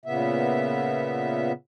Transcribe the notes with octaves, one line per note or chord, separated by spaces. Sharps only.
A#2 C#3 B3 E5